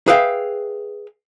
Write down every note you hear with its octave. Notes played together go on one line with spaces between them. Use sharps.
G#4 B4 E5 F5 G5